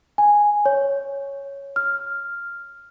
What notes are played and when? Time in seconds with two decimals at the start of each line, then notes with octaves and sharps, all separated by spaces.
0.18 G#5
0.66 C#5
1.76 F6